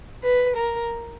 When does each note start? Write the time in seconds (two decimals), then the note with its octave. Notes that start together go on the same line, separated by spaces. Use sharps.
0.24 B4
0.57 A#4